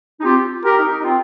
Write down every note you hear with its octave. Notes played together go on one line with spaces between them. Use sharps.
D#4
C4 F4 G4
G4 A#4
D#4 G4
D#4
C4 F4